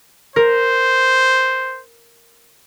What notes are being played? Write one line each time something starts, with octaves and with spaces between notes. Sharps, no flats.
A#4 C5